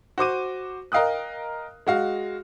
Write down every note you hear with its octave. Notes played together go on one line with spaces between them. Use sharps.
F#4 C5 D6 D#7
A#4 D#5 F5 G5 D#6 F#6
G#3 F#4 F5